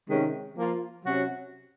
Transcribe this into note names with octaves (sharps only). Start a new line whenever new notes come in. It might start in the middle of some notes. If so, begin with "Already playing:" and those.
C3 D#3 G#3 C#4
F3 A#3 F4
C3 F#3 C#4 F#4